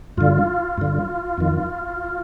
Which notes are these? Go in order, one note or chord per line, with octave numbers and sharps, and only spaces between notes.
G2 D3 F4
G2 D3
F2 D#3